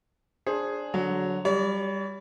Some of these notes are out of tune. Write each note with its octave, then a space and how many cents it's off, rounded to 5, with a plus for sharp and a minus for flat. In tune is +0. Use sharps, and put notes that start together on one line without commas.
D4 +0 G#4 +0 C5 +20
D3 -15 F#3 +0
G3 +10 C#5 +45